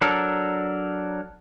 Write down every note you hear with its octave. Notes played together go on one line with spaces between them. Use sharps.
F#3 D4 A4 A#4